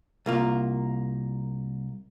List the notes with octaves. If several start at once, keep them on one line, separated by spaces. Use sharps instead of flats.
C2 A#3 F4